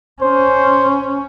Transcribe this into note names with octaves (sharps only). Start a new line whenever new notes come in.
C#4 C5